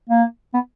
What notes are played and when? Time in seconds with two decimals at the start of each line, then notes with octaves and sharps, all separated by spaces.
0.10 A#3
0.54 B3